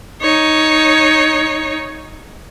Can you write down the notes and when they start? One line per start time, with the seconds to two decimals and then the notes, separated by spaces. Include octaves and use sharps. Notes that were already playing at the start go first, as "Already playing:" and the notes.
0.22 D#4 C#5